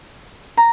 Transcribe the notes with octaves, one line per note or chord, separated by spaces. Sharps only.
A#5